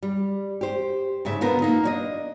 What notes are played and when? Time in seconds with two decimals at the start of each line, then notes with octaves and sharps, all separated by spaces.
0.03 G3
0.61 G4 C5
1.25 G#2 C#3 E5
1.41 D3 B3 F4 A#4
1.62 A#3 D#4
1.84 D4 C#5 D#5